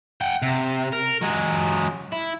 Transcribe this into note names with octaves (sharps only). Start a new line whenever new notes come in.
F#5 G5
C3
A#4
F#3 G#3
E4